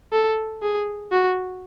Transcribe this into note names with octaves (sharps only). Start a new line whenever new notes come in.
A4
G#4
F#4